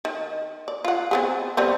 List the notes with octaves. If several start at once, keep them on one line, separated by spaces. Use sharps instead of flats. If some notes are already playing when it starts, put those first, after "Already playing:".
D#3
D5
F4 F#5
B3 C4 G#4
G3 B3 C4